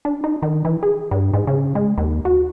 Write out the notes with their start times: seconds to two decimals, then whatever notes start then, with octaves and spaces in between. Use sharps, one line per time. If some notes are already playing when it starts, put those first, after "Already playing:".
0.05 D4
0.24 D#4
0.42 D#3
0.65 E3
0.83 G#4
1.11 G2
1.34 G#2
1.47 C#3
1.75 G#3
1.98 D#2
2.25 F#4